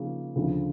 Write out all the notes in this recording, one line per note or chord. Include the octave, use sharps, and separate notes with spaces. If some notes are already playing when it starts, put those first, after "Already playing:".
Already playing: C#3 F3 A#3 D#4
D2 C#3 F3